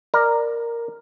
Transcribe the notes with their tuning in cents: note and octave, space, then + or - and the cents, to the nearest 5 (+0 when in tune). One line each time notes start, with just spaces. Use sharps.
A#4 +0 D5 +15